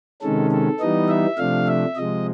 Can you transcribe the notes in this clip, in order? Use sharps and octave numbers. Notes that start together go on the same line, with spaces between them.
C3 D#3 G#3 C#4 A4
A4
E3 G3 B3 D#4 D#5
E5
C3 F3 A3 D4 F5
E5
C3 F3 G#3 D#5